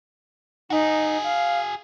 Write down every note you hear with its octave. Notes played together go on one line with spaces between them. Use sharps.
D#4 F#4 G#4
F5